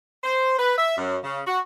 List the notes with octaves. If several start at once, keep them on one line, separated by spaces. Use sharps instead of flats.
C5
B4
E5
F#2
C#3
F#4